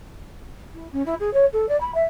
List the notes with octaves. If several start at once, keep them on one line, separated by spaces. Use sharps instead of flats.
E4
C#4
E4
G#4
C#5
A4
D5
B5
E5